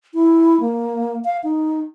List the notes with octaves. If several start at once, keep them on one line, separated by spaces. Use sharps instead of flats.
E4
A#3
F5
D#4